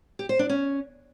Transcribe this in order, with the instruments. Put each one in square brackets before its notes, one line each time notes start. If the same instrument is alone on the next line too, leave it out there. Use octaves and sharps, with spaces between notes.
[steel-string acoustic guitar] G4
C5
D4
C#4